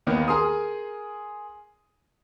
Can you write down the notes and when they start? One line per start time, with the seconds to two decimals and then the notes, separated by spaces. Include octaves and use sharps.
0.07 D#2 D#3 A#3 B3
0.28 G#4 A#4 C6 D#6